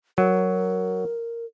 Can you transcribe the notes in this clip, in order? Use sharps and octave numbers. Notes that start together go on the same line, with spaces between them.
F#3 A#4